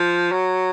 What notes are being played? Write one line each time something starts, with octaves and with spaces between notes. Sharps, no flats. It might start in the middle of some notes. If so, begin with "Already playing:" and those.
Already playing: F3
F#3